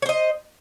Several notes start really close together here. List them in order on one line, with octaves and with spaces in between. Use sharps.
C#5 C5 D#5